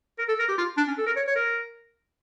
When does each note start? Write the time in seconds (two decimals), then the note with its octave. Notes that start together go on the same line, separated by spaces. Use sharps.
0.18 A#4
0.28 A4
0.39 A#4
0.48 G4
0.58 F4
0.77 D4
0.88 C#4
0.98 A4
1.07 A#4
1.16 C#5
1.27 C#5
1.36 A#4